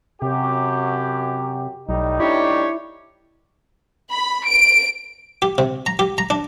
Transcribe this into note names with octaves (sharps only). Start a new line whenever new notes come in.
F#2 C3 G4
B1 A2 G3 D#4
D4 E4 G4 C#5
B5
D7
G4
C3
A#5
G4
A#5
D4